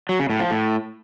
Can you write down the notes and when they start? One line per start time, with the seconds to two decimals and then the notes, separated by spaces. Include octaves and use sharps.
0.09 F#3
0.19 C#3
0.30 A2
0.40 F3
0.50 A2